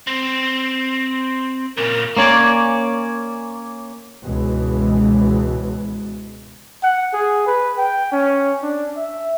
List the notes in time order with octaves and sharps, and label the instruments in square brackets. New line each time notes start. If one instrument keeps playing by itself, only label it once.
[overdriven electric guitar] C4
[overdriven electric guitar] A#2 C#3 [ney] A#4
[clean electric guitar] A#3 C#4 C#5 D5
[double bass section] C#2 G#2 B2 E3 G#3
[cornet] F#5
G#4
B4
G5
C#4
D4
E5